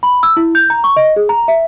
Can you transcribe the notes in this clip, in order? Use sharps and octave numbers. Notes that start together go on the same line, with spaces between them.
B5
E6
E4
G6
A#5
C#6
D#5
G#4
A#5
E5